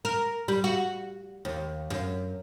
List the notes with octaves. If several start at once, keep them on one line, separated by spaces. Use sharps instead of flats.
A#4
G3
F#4
D#2
F#2